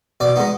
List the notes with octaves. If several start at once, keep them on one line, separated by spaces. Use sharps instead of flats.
B2 D5
G#3 B3 D#4